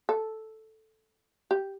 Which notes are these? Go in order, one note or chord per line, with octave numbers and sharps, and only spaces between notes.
A4
G4